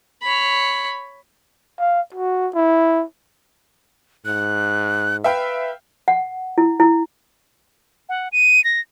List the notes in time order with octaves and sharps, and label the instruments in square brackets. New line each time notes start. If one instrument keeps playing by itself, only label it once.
[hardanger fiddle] C#5 B5
[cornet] F5
F#4
E4
[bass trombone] G#2 [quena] F#6
[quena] B4 [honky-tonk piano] E5 F5 G5
[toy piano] F#5
E4
E4
[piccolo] F#5
D#7
A#6